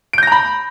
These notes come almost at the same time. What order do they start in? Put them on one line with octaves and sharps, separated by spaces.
D7 G6 A#6 A#5 B5